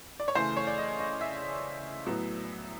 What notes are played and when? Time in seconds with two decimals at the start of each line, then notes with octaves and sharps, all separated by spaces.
0.20 D5
0.28 C#5
0.35 C#3 E3 A3 C5
0.57 C#5
0.67 D5
0.78 D#5
0.99 D#5
1.21 E5
2.07 A2 F#3 B3